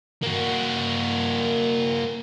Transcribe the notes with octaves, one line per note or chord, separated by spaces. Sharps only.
A#3 F#4